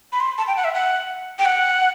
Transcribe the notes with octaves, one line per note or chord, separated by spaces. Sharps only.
B5
C6
A5
G5
F#5
E5
F#5
G5
F#5